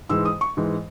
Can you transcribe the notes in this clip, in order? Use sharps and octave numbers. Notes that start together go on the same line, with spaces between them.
G#2 E3 G#3 E6
D#6
C#6
G#2 E3 G#3